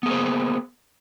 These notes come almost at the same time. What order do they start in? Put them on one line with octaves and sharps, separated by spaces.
B3 G#4 A#3 C5